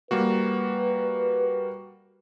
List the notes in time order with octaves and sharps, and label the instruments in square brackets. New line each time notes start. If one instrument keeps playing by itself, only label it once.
[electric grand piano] G3 A#3 F#4 [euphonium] B4